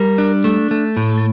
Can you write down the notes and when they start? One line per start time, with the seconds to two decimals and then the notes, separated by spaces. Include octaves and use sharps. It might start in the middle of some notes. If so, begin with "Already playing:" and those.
Already playing: G3 A#4
0.18 D4
0.44 A3
0.71 A3
0.97 A2